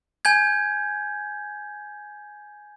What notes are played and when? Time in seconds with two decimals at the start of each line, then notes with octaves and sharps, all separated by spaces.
0.25 G#5 G6 G#6